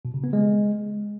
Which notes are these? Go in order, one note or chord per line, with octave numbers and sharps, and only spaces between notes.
B2
C#3
B3
G#3